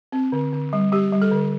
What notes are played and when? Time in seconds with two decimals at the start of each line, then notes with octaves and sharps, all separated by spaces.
0.12 C4
0.32 D3
0.52 D3
0.73 G3
0.92 G3 G4
1.12 G3
1.22 A4
1.31 D3